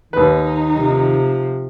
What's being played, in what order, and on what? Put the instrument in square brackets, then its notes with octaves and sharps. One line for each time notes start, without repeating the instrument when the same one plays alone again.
[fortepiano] D#2 B4 [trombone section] D#3 [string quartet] D#4
[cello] C3 F3